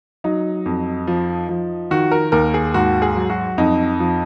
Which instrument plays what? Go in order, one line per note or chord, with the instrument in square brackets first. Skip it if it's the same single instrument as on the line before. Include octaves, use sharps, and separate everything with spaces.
[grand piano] F#3 D#4
F2
F3
F3
D#3 F#4
A#4
D#2 A#4
G#4
G#2 F#4
G#4
F#3
F#4
F2 D#4
F3